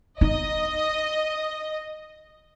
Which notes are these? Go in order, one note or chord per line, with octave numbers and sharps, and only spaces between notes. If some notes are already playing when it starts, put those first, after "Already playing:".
D#4 D#5